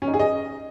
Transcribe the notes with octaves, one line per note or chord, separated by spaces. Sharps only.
C#4
D#4
G#4
D#5